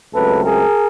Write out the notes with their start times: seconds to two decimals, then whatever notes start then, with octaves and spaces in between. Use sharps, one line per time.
0.13 C#2 C#3 F#3 A3 C4 A4 B4
0.44 G#4 A#4